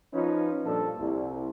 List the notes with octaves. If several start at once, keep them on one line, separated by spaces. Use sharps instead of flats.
F3 C#4 D#4 F4 B4
G2 A#2 F3 D4 A4
C2